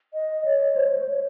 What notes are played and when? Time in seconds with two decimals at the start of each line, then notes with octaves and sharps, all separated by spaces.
0.14 D#5
0.45 C#5
0.76 C5
0.87 C#5
0.98 C5
1.09 C#5